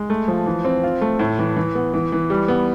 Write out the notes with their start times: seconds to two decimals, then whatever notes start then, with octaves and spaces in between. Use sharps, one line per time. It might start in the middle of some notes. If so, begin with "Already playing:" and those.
Already playing: G#3
0.10 A3
0.28 F3
0.46 E3
0.65 C4
0.84 F4
1.01 A3
1.19 A2
1.39 E3
1.56 E3
1.75 B3
1.93 E3
2.12 E3
2.30 G3
2.48 B3